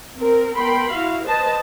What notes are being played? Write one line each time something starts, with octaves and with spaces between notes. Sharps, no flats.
C4 A#4
B3 A#4 G5 B5 C6
E4 F#4 F5
B4 C5 D#5 A5